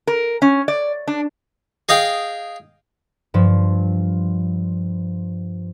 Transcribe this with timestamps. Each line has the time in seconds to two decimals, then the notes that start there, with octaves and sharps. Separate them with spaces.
0.07 A#4
0.42 C#4
0.68 D5
1.08 D4
1.89 G#4 D#5 F5 G5
3.34 G2 F3